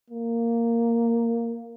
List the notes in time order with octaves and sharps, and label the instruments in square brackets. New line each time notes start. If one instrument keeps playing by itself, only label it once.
[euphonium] A#3